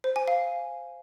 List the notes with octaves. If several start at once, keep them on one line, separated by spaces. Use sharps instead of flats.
C5
G#5
F5